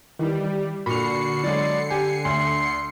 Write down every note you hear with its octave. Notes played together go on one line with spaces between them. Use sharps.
D#3 E3 G3
A#2 D3 F#4 B5 C7 C#7 F7
F#3 G#3 D5
G4 G#5
D2 C6